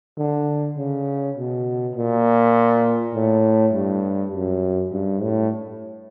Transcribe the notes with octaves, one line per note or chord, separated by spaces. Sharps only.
D3
C#3
B2
A#2
A2
G2
F#2
G2
A2